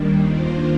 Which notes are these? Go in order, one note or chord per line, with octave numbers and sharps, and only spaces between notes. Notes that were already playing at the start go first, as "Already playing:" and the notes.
Already playing: D#2 D#3 G3 A#3 D4
D#3 A#3 D4 F4 C5